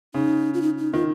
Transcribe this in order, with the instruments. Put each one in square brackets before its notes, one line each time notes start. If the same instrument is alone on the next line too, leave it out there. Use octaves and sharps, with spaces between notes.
[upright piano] C#3 [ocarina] D#4
[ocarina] F4
D#4
D#4
[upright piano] D#3 [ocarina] F4